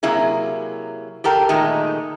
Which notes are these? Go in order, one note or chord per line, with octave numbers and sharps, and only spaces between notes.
C3 F#3 A#3 E4 G#4
G4 A4 A#4 G5
A#2 D#3 G#3 A3